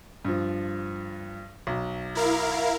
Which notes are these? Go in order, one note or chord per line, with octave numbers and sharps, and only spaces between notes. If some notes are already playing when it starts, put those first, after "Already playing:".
G2 F3
B1
E4 A#4 F5